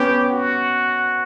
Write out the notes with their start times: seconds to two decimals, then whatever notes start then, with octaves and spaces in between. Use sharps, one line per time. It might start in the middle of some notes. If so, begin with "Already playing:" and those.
Already playing: B3 C#4 G4
0.30 F#4